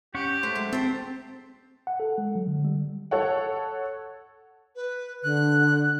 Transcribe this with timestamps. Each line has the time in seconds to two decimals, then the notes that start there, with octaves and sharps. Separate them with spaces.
0.15 C#4 G4 F#5 C#6
0.43 A3 C5 E5
0.55 F#3 G#3 A3
0.73 C4 C5 G5 A5
1.87 F#5
2.00 A4
2.18 G#3
2.35 F#3
2.48 D3
2.65 G3
3.11 A4 C#5 F#5
4.75 B4
5.24 D3 F#6